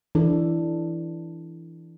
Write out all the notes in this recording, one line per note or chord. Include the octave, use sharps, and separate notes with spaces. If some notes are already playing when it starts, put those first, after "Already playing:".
E3 D4 A4